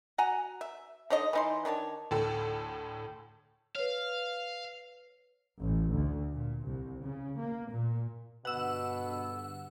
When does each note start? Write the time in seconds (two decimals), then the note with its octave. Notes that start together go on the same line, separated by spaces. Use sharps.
0.18 F#4 F#5 G#5 A#5
0.61 E5
1.10 D3 D#4 C#5 D#5
1.33 E3 D#4 C6
1.65 D#3 D4 C#5 A5
2.11 D2 A2 A4 A5
3.76 B4 C#5 F5
5.60 A1
5.93 D2
6.33 A#2
6.64 C2
7.02 C#3
7.38 A#3
7.69 A#2
8.45 G2 B2 D3 B3 F#5 E6